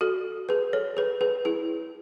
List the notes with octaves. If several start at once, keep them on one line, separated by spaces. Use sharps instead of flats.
F#4 A4
G#4 B4
A4 C#5
G#4 B4
G#4 B4
E4 G#4